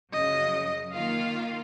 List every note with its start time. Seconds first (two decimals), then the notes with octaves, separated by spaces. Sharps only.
0.13 F#2 C#3 F#3 D#5
0.93 D#3 A#3 F4 F5